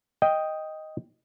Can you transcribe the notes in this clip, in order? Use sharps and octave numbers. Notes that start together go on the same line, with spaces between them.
D#5 G5